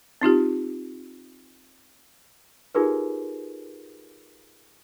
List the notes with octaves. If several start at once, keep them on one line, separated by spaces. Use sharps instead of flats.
C4 D#4 F4 G4
D#4 F4 G4 G#4 A#4 B4